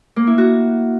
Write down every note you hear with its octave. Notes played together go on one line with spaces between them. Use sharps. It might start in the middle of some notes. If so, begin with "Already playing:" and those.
A#3
E4
F#4